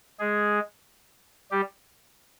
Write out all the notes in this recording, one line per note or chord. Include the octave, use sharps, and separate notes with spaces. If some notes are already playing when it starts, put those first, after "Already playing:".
G#3 G#4
G3 G4